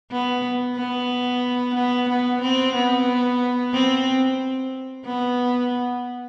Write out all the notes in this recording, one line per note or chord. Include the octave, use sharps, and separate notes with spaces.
B3
B3
B3
B3
C4
B3
C4
B3